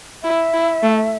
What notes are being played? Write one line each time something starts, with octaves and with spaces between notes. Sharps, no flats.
E4 E5
E4
A3